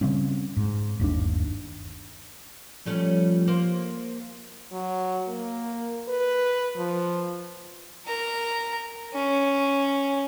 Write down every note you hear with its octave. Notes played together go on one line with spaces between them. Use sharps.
C#3 G3 C4 C#4
G#2
G1 D#2 C3 D4
F3 G3 A3 C#4
A#3 C5
F#3
A#3
B4
F3
A#4 A#5
C#4